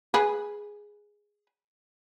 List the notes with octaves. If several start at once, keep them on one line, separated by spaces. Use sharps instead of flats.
G#4 B4